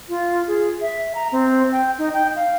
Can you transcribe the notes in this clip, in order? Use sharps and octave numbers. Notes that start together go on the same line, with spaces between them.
F4
G#4
E5
A#5
C4
G5
D#4
G5
F5